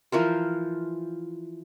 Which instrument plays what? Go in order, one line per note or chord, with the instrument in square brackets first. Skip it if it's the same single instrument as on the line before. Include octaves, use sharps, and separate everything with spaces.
[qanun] E3 F3 A#4 C5